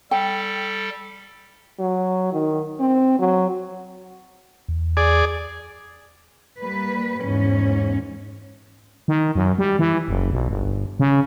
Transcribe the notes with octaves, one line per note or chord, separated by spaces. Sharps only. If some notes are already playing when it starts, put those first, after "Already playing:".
G3 A4 G5
F#3
D#3
C4
F#3
E2
G#4 D5
G3 A#3 B4
E2 G#2 C#4
D#3
F#2
G3
E3
F#1
B1
G1
C#3